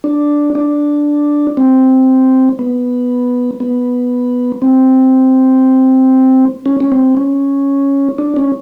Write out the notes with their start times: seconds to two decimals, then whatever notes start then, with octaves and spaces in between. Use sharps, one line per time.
0.04 D4
0.55 D4
1.57 C4
2.59 B3
3.60 B3
4.62 C4
6.66 C#4
6.80 C#4
6.92 C4
7.17 C#4
8.18 D4
8.37 C#4